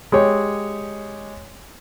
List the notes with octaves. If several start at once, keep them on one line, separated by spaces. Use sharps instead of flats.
G#3 G4 C#5